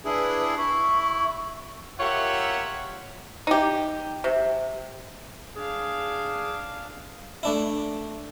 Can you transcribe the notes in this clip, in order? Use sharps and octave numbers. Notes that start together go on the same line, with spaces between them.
D4 E4 G#4 B4
E4 C#6
F4 G4 A#4 C#5 E5 F#5
D#4 G4
C3
D4 G#4 F5
A3 D4 E4